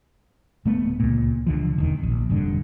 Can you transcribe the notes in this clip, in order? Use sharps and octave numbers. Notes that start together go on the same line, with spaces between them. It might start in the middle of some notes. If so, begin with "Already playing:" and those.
D1 A3 B3
C#2 A#2
C#2 D3 F3
E1 D#2 D#3
A#1
F1 G2 D3